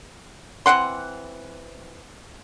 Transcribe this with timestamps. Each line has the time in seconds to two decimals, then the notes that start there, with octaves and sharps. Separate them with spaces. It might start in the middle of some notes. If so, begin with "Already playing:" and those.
0.66 E3 C4 F#5 C6